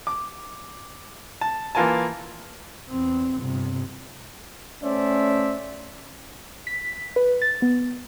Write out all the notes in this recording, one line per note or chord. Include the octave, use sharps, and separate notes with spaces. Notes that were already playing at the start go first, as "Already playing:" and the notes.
D6
A5
E3 A#3 F4 A#4 G#5 A5
E2 C4
G1 C3
A3 C#4 C5 D5 E5
B6
B4
A6
B3